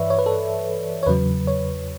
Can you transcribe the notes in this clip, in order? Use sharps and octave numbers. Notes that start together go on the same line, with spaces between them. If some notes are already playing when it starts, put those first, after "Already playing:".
Already playing: G2 E3 B4 C#5 D5 E5
C#5
B4
A4
C#5
E2 C#3 F#3 B4
C#5